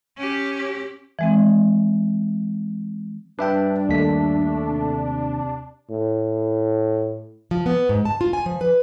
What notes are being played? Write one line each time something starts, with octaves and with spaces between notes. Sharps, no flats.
C#4 G4
E3 G#3 C4
G2 D4 B4 E5 G5
D#2 A3 B6
C3
A2
F3
B3
G#2
A5
F4
G#5
F3
B4